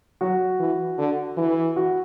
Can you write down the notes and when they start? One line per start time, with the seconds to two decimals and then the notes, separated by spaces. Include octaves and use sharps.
0.21 F#3 F#4
0.60 E3
0.98 D3
1.37 E3
1.76 F#4